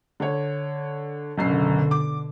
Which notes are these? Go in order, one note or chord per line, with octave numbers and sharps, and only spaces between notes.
D3 C#5
F#1 F#2 B2 D3 C7
D6